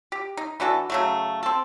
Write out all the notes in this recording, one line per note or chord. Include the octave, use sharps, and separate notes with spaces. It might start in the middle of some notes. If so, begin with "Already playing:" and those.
G4
D#4
E3 D4 F#4 A4
C#3 F#3 A3
C4 A4